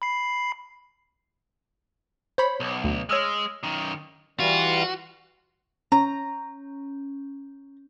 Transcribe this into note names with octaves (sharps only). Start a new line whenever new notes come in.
B5 C7
C5 C#5 B5
B1
D2
G#3 C#5 E6 F6
F#2 D#3
E3 G3 F4 F#4
C#4 A#5